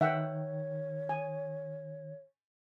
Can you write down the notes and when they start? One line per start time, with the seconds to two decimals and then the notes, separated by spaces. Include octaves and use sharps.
0.01 D#3 C#5 E5 F#5 G5
1.09 G#5